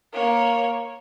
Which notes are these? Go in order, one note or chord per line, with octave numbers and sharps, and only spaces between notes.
A#3 C#5